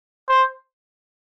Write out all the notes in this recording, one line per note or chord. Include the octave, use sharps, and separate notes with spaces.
C5